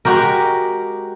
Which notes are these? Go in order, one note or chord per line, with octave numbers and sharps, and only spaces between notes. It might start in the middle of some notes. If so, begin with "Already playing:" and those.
G#3 F#4 G4 A#4